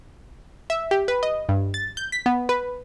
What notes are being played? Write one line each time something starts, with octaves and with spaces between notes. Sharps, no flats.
E5
G4
B4
D#5
G2
A6
G6
B6
B3
B4